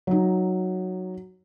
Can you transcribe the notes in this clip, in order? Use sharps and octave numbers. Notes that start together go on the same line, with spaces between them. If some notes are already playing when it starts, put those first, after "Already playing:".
F#3 D#4